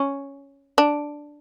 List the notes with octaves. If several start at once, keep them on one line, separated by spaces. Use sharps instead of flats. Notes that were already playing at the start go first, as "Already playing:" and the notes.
Already playing: C#4
D4